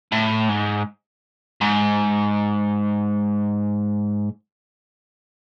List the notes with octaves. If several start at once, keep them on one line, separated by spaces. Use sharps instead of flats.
A2
G#2
G#2